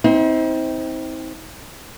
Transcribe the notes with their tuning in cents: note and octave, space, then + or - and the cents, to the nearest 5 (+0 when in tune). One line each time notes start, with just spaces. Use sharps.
C4 +0 D#4 +45